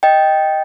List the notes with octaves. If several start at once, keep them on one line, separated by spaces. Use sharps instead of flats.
D#5 G5